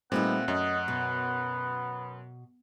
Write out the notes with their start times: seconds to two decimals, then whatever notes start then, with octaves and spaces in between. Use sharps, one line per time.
0.12 A#2 G3 A3 B3 C4 D#4 F#5
0.48 F#2 C#4 D#5
0.88 B2 B3